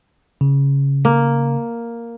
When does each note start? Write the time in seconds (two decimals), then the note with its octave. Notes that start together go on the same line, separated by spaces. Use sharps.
0.41 C#3
1.05 A#3